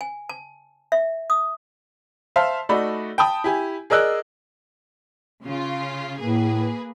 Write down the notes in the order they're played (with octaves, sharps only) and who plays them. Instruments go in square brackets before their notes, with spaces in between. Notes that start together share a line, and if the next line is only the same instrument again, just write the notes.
[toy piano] G#5
A5
E5
D#6
[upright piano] C5 E5 F5 A5 C6
A3 D#4 F#4 D5 B5
G5 A5 B5 D#6
E4 G4 G#5
G#4 A#4 D5 D#5 E6 F#6
[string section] C#3 F4
[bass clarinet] A2 [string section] A#3 G#4 B4